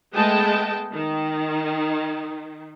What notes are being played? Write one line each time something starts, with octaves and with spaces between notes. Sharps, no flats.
G#3 A3 B3 D#5 G5 A5
D#3